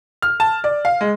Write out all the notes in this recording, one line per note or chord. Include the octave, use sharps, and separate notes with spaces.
F6
A5
D5
F5
G#3